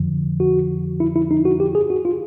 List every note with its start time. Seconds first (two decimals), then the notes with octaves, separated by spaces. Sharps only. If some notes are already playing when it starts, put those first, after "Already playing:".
Already playing: F2 D3 F3
0.40 F#4
1.00 E4
1.16 E4
1.31 D#4
1.45 F#4
1.60 G4
1.75 G#4
1.90 F#4
2.05 F4